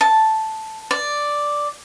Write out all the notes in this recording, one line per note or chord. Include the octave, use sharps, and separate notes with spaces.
A5
D5